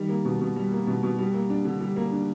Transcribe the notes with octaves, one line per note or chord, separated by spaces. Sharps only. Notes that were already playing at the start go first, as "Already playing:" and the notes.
Already playing: D#3 G3
A#3
B2
B2
G3
A#3
B2
B2
G3
A#3
D4
D3
G3
A#3
D4